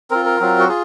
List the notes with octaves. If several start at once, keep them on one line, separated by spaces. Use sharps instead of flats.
C4 F4 A#4
A#4
F#3 C4 F4
F#4
F4 G#4